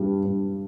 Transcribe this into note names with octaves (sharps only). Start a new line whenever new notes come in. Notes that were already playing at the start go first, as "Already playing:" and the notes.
Already playing: G2 G3
G2